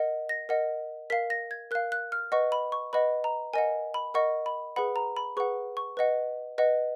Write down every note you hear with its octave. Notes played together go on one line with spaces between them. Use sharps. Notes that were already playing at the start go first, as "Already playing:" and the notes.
Already playing: A#4 D#5 F#5
A#6
A#4 D#5 F#5
A#4 F5 B6
A#6
G#6
A#4 F5 F#6
F#6
F6
B4 D#5 F#5 C#6
B5
C#6
B4 D#5 F#5 B5
A#5
A#4 D#5 F#5 G#5
B5
A#4 D#5 F#5 C#6
B5
G#4 B4 F#5 B5
A#5
B5
G#4 B4 F#5 C#6
C#6
B4 D#5 F#5
B4 D#5 F#5